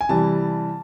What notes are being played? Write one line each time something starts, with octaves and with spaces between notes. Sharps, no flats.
G#5
C3 E3 G3 A5